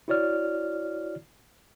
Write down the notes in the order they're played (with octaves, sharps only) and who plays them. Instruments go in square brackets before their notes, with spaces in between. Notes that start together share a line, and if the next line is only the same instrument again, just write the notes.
[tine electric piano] E4 F#4 C#5 D5 F6